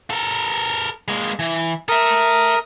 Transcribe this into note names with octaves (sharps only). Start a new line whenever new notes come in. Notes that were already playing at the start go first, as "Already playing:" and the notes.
A4 A#4
G#3 A#3
E3
A4 A#4 E5 D#6